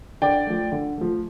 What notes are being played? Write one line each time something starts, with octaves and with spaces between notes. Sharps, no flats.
D3 D5 G5
F3 A3
D3
F3 A3